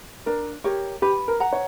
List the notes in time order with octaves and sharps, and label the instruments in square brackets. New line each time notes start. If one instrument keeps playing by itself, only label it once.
[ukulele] D4 [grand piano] A#4
[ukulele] G4 A#4 C#5
[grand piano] G4 [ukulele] B4
[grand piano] A#4
[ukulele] F#5 A#5
[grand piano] C#5